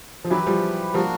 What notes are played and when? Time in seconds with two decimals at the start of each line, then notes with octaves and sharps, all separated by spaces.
0.25 F3
0.30 E3 F#3 E4 G4 B4
0.46 F3 G3
0.94 F3 G3 A#3 D4 F#4 A#4